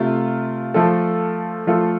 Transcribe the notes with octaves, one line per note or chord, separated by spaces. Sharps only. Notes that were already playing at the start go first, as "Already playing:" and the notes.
Already playing: C3 A3 F4
F3 A3 F4 A4
F3 A3 F4 A4